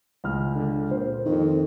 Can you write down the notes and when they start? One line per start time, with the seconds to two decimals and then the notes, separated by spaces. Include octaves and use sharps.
0.24 C#2 F6
0.55 D3
0.91 A#2 C5
1.25 F2 D#3